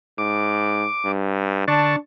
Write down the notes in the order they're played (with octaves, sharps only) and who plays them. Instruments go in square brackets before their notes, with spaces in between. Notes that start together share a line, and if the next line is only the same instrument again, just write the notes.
[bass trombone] G#2 [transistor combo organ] D6
[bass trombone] G2
[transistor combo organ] D3 A5 C#6 [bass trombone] D4